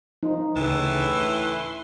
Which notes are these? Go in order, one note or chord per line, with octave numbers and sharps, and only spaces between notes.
F3 D#4
D2 A2 C#3 E3 A5
C6